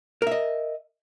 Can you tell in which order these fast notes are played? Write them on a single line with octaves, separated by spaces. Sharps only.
A#4 E5 D#5